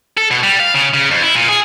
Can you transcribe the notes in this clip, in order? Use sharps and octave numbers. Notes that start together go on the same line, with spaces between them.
A4
B2
G3
F5
C#3
C#3
F2
E4
A#2
G#4